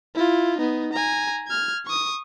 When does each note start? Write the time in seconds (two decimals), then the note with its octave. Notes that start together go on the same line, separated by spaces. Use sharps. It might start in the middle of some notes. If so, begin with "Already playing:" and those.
0.15 E4 F4
0.58 B3 D#4
0.93 G#5 A#5
1.47 F6 G#6
1.86 C#6 D#6